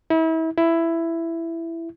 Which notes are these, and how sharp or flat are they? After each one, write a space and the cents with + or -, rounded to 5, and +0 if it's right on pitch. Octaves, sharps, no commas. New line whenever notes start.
E4 -35
E4 +10